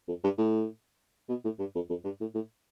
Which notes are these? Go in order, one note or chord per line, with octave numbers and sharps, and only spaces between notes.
F2
G2
A2
B2
A2
G2
F2
F2
G2
A2
A2